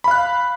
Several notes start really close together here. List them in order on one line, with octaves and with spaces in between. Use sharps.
B5 F5 F#6